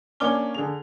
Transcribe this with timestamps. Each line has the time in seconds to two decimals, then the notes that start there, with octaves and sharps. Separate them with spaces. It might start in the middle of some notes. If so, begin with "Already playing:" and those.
0.20 A#3 C#4 D4 D6 F6 G7
0.54 D3 G#4 F7